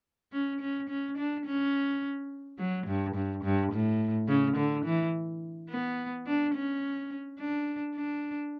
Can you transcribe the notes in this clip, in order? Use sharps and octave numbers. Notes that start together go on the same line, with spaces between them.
C#4
C#4
C#4
D4
C#4
F#3
G2
G2
G2
A2
C#3
D3
E3
B3
D4
C#4
D4
D4